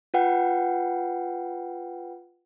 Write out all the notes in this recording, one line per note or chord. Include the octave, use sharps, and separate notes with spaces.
F4 B4 F#5 G5